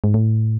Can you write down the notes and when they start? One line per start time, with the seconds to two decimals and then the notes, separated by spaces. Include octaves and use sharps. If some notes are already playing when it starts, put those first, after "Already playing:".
0.04 G#2
0.14 A2